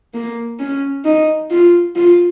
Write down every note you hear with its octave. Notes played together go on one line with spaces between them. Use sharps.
A#3
C#4
D#4
F4
F4